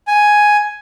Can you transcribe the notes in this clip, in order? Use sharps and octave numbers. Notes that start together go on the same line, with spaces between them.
G#5